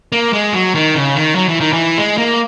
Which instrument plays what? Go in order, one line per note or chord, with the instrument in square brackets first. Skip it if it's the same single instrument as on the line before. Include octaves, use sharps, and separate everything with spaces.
[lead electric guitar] A#3
G#3
F#3
D#3
C#3
D#3
F#3
E3
D#3
E3
G#3
A#3